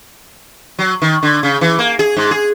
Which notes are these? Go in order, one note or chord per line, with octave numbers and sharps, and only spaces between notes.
F#3
D#3
D3
C#3
E3
A#3
G#4
G#2
G#4